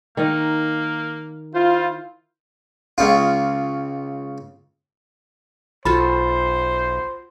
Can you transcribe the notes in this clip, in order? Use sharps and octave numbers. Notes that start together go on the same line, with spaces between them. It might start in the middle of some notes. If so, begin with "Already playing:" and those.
D#3 A#3 D#4 D#5
E4 F4 C5
C#2 C#3 F4
B1 F4 F#4 A4 C5 B5